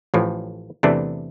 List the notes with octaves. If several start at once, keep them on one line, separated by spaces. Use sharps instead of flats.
A1 A2 F3
E2 C3 E3 A3 D4